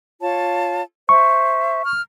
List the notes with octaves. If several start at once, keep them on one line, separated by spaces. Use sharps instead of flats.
F4 C#5 A5
C5 E5 C#6
F6